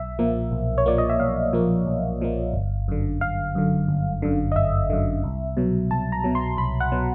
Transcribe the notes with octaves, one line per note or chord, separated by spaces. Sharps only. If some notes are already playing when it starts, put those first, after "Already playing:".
Already playing: B1 E5
A#2 F3 A#3
B1
C#5
A#2 F3 A#3 D5
D#5
E5
B1 F5
A#2 F3 A#3
B1
A#2 F3 A#3
G1
F#2 D3
G1 F5
F#2 D3
G1
F#2 D3
D#5
G1 E5
F#2 D3
C2
B2 F#3
C2 A5
A#5
B2 F#3
C6
C2 B5
F#5
B2 F#3